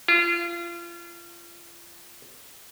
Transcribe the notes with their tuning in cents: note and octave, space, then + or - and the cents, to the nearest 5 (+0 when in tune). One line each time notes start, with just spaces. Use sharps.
F4 -30